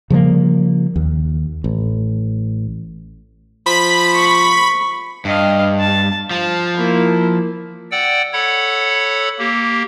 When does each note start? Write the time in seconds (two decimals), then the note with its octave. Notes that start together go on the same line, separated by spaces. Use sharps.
0.10 C#3 F3 G3 A#3
0.96 D#2
1.64 A1
3.66 F3 B5 B6
4.14 C#6
5.25 G2 D#5 F5
5.80 A5
6.31 F3 A5
6.77 A#3 E4
7.91 D5 F#5 G5 E6
8.33 A4 C#5 F#5 B5
9.39 A#3 G4